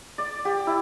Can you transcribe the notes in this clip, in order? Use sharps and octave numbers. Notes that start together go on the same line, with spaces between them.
D5
G4
E4